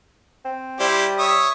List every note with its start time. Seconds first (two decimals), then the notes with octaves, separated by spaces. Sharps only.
0.44 C4
0.80 G3 E4 G4 C5
1.19 C#5 E5 D#6